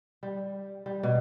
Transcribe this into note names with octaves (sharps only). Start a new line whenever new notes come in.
G3
G3
B2